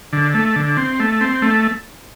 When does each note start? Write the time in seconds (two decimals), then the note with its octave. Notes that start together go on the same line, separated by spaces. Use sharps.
0.13 D3
0.34 A3
0.56 D3
0.77 C4
1.00 A3
1.21 C4
1.42 A3